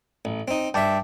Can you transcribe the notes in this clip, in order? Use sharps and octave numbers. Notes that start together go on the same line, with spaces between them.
A1
C4 D#4
G2 E5 G5 A5 D6